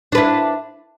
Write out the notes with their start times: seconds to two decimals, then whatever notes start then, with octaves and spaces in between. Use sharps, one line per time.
0.12 D4
0.15 B4
0.17 E4